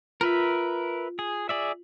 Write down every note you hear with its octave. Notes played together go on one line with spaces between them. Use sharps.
F4 A#4 B4 E5
G#4
G#4 D5 E5